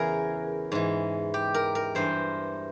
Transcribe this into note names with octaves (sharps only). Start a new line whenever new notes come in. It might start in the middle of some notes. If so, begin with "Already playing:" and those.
Already playing: E2 C#3 E3 E4 G#4 A#4
G#2 E3
G4
A#4
A#4
G2 E3 C5